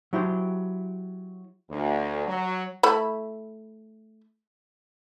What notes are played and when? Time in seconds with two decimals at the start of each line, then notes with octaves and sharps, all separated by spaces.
0.13 F#3 E4 G4 C5
1.70 D2
2.27 F#3
2.83 A3 E4 B5